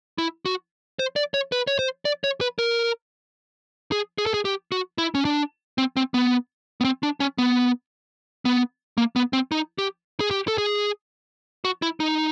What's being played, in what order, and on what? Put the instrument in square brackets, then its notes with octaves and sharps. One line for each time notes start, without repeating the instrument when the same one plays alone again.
[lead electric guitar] E4
F#4
C5
D5
C#5
B4
C#5
C5
D5
C#5
B4
A#4
G#4
G#4
A4
G#4
G4
F#4
E4
C#4
D4
C4
C4
B3
B3
C4
D4
C#4
B3
B3
A#3
B3
C4
D#4
G4
G#4
G4
A4
G#4
F#4
E4
D#4